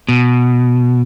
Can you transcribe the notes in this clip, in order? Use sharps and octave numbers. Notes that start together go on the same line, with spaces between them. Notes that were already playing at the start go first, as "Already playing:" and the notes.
B2